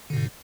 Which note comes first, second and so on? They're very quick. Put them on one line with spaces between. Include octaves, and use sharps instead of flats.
D3 B2 G#2